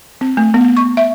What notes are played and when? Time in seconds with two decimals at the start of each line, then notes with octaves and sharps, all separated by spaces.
0.21 C4
0.37 A3
0.54 B3
0.77 C#6
0.97 E5